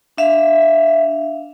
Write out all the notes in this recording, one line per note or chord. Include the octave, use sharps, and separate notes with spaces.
D4 E5 F5